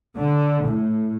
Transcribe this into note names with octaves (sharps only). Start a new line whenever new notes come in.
D3
A2